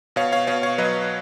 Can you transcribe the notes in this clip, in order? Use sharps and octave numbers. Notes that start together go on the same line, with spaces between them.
B2 C#5 F5
C#5 F5
B2 C#5 F5
C#5 F5
F#3 B4 D#5